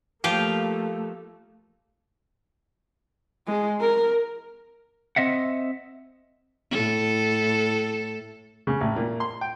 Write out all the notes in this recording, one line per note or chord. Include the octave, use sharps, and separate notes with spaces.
F3 A3 A#3 F4 G4
G#3
A#4
C4 D#5 E5 F#5
A2 A4
C#3
A1
A#2
C6
G5